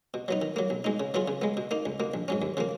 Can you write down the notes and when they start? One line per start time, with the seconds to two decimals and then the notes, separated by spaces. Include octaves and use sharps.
0.14 B2
0.28 F#3 B3 D#4
0.42 D#3
0.56 F#3 A#3
0.70 B1
0.84 B2 G#3 D#4
1.00 C#3
1.14 F#3 B3 F4 G#4
1.28 C#3
1.42 G#3 B3
1.57 B2
1.71 A#3 D#4
1.86 C#2
2.00 B2 A#3
2.14 A#1
2.28 G#2 F#3 C#4
2.42 D#2
2.57 C#3 F3 A#3